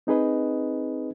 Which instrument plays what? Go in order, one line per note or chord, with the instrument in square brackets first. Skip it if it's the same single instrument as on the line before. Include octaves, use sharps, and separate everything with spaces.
[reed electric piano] C4 D#4 G#4 B4 D#5